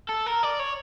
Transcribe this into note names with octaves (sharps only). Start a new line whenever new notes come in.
A4
A#4
D5
C#5